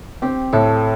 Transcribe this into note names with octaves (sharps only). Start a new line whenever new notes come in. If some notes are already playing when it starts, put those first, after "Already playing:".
C4 G4
A2 A4